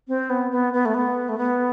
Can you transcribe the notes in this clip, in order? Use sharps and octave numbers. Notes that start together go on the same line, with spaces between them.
C4
B3
B3
B3
A3
B3
A3
B3